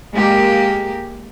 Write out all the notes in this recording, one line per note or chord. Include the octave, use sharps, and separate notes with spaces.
G#3 A#3 G4